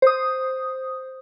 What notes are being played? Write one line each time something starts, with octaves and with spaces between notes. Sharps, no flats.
C5 D#6